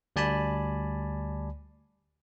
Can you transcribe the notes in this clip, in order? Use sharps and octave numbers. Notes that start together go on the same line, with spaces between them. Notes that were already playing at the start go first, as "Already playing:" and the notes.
D2 G3 D5 G#5 A5 B5